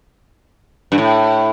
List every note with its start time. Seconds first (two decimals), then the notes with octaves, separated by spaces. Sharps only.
0.92 G2
0.98 A2